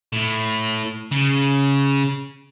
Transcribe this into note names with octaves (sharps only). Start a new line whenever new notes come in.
A2
C#3